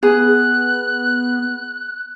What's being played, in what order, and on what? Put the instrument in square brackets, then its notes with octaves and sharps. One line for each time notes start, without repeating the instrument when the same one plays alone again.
[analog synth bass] B3 [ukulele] G#4 [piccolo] F#6